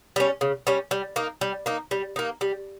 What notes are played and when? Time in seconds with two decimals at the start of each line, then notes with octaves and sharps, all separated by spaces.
0.16 G3 C#4
0.41 C#3
0.67 G3 C#4
0.91 G3
1.16 A#3 D#4
1.41 G3
1.66 A#3 D#4
1.91 G3
2.16 A#3 D#4
2.41 G3